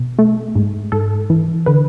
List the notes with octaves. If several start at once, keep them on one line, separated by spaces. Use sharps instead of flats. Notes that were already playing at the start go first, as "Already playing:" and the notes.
Already playing: B2
A3
G#2
G#2 A4
E3
D3 B4